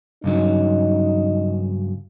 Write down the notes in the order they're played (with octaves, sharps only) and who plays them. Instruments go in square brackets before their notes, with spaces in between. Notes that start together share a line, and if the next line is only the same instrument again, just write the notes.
[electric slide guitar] G2 C#3 F#3 [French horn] D#4